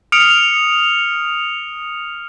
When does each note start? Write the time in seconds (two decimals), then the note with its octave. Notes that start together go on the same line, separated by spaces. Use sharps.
0.12 D#6 F6 C#7 D7 F7